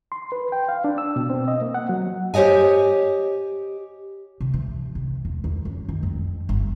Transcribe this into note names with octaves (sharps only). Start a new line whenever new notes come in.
C6
B4
G5
F5
D4
E6
B2
C4
D#5
A#3
F#5
F#3
G4 C5 C#5 D#5 G#5
C3
E3
C3
E2
E2
F#2
D#3
F2
G1